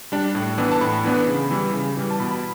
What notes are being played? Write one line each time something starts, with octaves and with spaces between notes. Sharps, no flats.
G3 D4
A2
E3 B3 D4
A5
A2 B5
E3 B3 D4
C#3
E3 G3
C#3
E3 G3
A5
B2 B5
B5